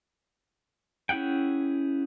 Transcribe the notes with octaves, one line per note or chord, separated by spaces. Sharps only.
C#4 E4 G#4 F#5 G5